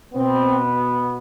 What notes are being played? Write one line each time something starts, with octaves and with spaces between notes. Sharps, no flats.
B2 B3 C4